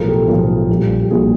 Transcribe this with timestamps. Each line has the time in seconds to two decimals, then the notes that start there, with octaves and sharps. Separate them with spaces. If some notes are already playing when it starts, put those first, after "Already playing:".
Already playing: B1 A2 F3 G#4 A#4
0.08 G4 A4
0.28 B1 A2 F3
0.69 A#1 A#2 G3
1.03 G4
1.10 A#1 A#2 G3 F#4 G#4